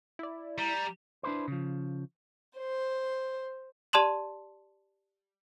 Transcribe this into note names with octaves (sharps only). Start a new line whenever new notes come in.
E4 D5
G3 A#5
D4 E4 B4 C5
C#3 F3
C5
G4 D5 A5 C6 E7 F#7